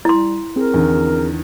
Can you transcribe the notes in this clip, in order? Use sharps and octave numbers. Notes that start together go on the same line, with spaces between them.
G3 E4 C6
C4 G#4 A#4
E2 D3 D#3